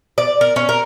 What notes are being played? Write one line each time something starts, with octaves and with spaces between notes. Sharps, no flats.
D5
A#4
C#4
A#4